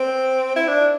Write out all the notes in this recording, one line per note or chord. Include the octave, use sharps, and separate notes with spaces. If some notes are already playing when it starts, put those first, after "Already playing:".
Already playing: C4
E4
D4